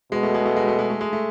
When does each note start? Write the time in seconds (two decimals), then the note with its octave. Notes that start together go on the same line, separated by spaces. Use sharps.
0.12 B2 G#3
0.23 A3
0.34 G#3
0.46 A3
0.56 G#3
0.68 A3
0.79 G#3
0.90 A3
1.01 G#3
1.13 A3